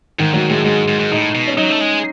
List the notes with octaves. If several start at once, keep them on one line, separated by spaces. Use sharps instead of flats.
G#2 D#3
G#2 F#3
A2 G#3
G#2 G#3
G#2
G#2
A2 D#4
B2
C#4
F#3 D#4
A3
G#3